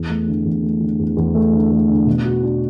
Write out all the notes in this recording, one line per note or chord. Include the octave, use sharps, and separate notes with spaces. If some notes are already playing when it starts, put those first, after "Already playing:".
Already playing: E2
A3
D3
E2
A3
D3
E2
E2
A3
D3
A3
D3
B2
F#4
D4